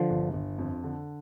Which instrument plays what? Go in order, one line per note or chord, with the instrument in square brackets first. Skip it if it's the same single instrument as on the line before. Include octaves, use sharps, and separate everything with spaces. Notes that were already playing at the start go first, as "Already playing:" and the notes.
Already playing: [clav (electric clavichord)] D3 F3
[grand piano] G1
G1
F2
D3